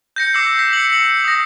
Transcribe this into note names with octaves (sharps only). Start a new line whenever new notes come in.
G6 A#6 C#7
D6 E6 C7
B6
C#7 F#7
F#7
D#6 A#6